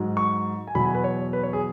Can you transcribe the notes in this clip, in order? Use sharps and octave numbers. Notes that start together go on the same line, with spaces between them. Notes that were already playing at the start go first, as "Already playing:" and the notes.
Already playing: G#2 F#3
C#6
G#5
E2 B2 F#3 B5
G#5
B4
C#5
B4
C#5
G#4